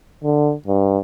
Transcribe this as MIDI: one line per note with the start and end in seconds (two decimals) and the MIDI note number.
0.24 0.53 50
0.67 0.98 43